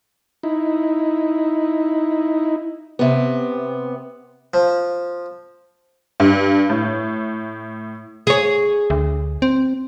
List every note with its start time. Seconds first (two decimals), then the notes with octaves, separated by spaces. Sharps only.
0.43 D#4 E4
2.99 C3 B3
4.54 F3
6.20 G2
6.70 A2
8.27 G#4 C#5
8.90 D2
9.42 C4